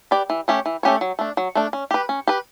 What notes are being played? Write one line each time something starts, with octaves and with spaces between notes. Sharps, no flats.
G4 B4 D5
E3
A3 C#4 G4 C#5
E3
A3 C#4 G4 C#5
F#3
A3 D4
F#3
A3 D4
C#4
G4 B4
C#4
G4 B4